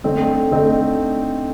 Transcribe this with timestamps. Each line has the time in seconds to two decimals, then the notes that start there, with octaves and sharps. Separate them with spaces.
0.04 D3 A3 C4 D#4
0.51 D3 A3 C4 D#4